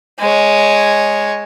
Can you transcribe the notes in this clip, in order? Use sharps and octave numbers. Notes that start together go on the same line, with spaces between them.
G#3 C#5